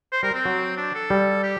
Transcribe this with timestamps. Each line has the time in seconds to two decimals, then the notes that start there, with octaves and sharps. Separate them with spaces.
0.12 C5
0.23 G3 A#4
0.34 C4
0.45 F#3
0.77 D4
0.95 A4
1.10 G3
1.43 G4